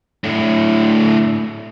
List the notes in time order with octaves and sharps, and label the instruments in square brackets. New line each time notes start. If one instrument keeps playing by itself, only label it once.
[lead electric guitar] A2 D3